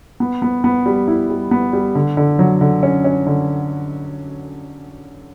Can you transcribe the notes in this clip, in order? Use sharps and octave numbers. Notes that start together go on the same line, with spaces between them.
B3
B3
B3
G3
E4
G3
B3
G3
D3
D3
F#3
D3
C#4
C#4
D3